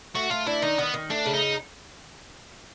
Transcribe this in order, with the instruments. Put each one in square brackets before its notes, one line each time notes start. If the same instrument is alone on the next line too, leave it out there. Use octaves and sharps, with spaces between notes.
[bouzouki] A3 [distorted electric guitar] F#4
[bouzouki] A3 [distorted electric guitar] F4
[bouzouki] D4 [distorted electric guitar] E4
[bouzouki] D#3 [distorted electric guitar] D#4
[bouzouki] D#3 [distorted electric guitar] B3
[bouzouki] D#3
[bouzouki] A3 [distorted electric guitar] D4
[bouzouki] C#3
[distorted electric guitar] D#4